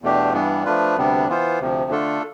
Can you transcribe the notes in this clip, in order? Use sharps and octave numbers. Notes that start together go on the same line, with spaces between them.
E2 B2 A3 D4 G4
G2 E3 G3 B3 D4
F3 A3 D4 F4 B4
D2 C3 G3 B3 D4
E3 B3 F4 C5
D2 C3 F3
D3 A3 D4 F4 A4